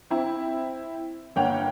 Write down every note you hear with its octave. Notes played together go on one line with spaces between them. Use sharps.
C4 E4
G1 A#3 C#5 F#5 G5 F7